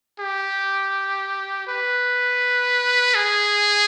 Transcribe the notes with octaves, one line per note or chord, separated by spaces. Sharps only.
G4
B4
G#4